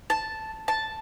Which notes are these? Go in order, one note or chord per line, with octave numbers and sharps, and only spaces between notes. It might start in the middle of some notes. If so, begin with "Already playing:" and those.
A5
A5